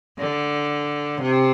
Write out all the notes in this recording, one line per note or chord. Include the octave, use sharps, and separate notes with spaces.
D3
C3